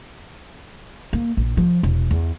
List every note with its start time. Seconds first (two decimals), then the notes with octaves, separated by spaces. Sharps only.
1.13 A#3
1.37 A#1
1.57 F3
1.83 E1
2.11 E2